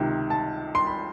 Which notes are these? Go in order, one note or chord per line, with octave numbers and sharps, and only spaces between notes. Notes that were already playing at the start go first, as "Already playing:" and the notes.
Already playing: C#2 C3 D#3
A5
C6
B5